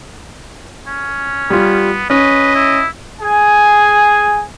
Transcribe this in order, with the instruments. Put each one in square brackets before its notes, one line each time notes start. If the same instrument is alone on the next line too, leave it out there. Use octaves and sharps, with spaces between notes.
[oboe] C#4
[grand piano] G3 F4 [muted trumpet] B3
[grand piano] C#4 [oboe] B4 [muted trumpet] D#5
[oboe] E4
[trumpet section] G#4 G#5